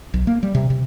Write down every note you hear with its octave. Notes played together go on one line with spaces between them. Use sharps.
B1
A#3
G3
C3
C3